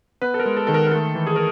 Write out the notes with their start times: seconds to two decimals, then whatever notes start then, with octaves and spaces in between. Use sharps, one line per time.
0.22 B3 B4
0.34 A4
0.39 A#4
0.45 G#3
0.57 A4
0.67 D#3 A4
0.74 A#4
0.87 A#4
0.91 A3 A4
1.15 E3
1.27 G#4
1.36 A#4